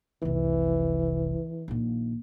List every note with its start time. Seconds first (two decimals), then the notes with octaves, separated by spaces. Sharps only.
0.22 F1 C2 E3
1.68 A#1 D#3